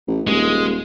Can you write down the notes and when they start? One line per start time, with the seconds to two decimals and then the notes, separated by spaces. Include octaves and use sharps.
0.08 A1
0.27 D#1 G#3